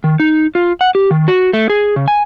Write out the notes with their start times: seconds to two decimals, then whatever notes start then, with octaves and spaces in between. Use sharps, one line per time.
0.04 D#3
0.20 D#4
0.55 F4
0.81 F#5
0.95 G4
1.11 D#3
1.28 F#4
1.53 A3
1.70 G#4
1.96 C#3
2.08 G#5